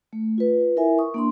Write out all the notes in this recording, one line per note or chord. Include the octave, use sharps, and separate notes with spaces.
A3
F4 B4
E4 A#4 E5 G#5
C#6 D#6
A#3 D4 C6